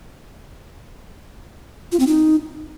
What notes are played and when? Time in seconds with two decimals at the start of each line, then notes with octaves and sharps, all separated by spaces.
1.92 F4
1.99 C4
2.07 D#4